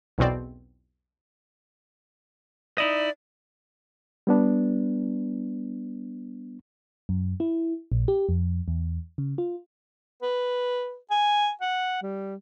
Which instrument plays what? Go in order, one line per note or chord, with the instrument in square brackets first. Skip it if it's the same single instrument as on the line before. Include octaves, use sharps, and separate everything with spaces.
[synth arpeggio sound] B1 E2 B2 C4 D5
[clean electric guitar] D#4 E4 D#5 [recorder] D5
[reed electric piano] G3 B3 D4
[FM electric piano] F#2
E4
A#1
G4
F2
E2
C#3
F4
[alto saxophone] B4
G#5
F#5
G3